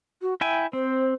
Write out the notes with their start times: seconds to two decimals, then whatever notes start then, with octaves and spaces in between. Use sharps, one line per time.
0.22 F#4
0.41 E4 E5 G5 G#5
0.73 C4 C5